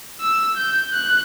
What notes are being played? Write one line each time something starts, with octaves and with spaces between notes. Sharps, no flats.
E6
G6
F#6